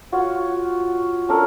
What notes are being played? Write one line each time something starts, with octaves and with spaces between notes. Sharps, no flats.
F4 F#4 C#5 F#5
C#4 D4 A4 A#4